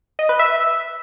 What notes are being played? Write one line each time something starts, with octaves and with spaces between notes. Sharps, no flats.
D#5
B4
E5